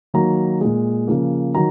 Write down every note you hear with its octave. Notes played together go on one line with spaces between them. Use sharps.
D#3 F#3 A#3 A#5
A#2 G#3
C#3 F3 A#3
D#3 F#3 A#5